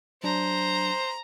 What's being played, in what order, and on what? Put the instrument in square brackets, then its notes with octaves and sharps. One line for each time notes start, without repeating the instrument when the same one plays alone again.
[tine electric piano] F#3 D4 [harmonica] C5 [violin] A#5